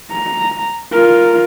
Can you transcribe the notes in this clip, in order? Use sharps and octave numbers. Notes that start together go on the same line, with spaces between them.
A#5
F4 A#4